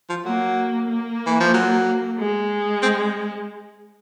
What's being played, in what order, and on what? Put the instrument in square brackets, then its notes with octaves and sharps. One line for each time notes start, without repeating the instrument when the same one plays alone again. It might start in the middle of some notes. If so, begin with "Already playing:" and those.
[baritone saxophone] F3
[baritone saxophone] F#3 [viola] A#3
[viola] A#3
[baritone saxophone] E3
F3
F#3
[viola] G#3
[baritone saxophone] C4